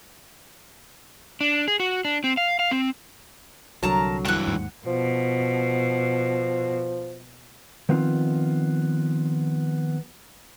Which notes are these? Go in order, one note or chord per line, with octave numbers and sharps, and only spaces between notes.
D4
G#4
F#4
D4
C4
F5
F5
C4
C2 D3 F#3 A#4 A5 A#5
G2 E3 F#5 F#6
D#2 G#2
B2 F3
D#3 F3 B3 C4 F4